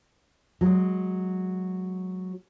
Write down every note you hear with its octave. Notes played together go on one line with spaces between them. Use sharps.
F#3 G#3